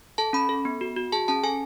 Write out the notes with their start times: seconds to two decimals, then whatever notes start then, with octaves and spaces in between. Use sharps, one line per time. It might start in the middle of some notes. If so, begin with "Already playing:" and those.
0.18 A4 A5
0.33 C#4 B5
0.49 A4
0.65 B3
0.81 F#4
0.96 F#4
1.12 G#4 A5
1.28 C#4 A5
1.44 A4 G#5